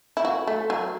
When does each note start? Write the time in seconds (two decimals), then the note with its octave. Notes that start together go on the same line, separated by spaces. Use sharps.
0.17 E4
0.25 F#4
0.47 A3
0.70 F#3